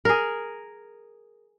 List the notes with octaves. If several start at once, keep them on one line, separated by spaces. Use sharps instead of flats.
G#4 A#4